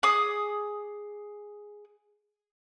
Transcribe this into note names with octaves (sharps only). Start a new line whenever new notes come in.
G#4 D6 D#6